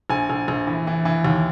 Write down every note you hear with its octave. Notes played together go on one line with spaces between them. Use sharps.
A#1 G#5
A#1
A#1
E3
E3
E3
D#2